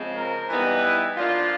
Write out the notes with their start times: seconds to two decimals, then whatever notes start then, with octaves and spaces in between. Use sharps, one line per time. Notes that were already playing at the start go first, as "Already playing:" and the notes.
Already playing: C#3 F3 G#3 C4
0.15 A#4
0.48 E3 G3 B3 D#4
0.83 E4
1.15 F3 A#3 D4 F4